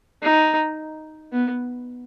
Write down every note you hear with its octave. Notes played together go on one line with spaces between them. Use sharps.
D#4
B3